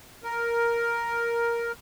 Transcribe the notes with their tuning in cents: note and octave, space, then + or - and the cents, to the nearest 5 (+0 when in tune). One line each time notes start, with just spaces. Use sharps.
A#4 +5